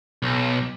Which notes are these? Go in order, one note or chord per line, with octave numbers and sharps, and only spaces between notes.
B1